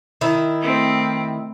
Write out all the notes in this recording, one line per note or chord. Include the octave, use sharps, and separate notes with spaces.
D#3 E4
A3 C4